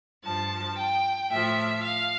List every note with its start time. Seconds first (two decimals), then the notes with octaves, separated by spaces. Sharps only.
0.24 G2 F3 A5
0.78 G5
1.31 A2 F3 E5
1.83 F5